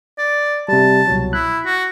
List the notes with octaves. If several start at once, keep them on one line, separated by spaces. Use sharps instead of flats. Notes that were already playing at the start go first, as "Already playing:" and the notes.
D5
C3 G3 A5
C2 B2 F#3
E4 F#6
F#4